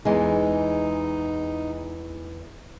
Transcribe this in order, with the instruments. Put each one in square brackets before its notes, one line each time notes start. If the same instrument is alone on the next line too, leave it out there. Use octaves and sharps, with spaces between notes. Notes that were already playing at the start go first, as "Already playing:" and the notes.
[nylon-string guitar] E2 E3 G#3 [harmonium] D#4